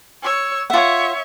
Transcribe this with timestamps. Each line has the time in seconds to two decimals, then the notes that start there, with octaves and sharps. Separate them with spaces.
0.23 C#5 E6
0.70 F4 C#5 E5 F#5